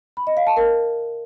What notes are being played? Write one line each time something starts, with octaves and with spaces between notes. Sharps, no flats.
B5
D#5
F5
A5
A#4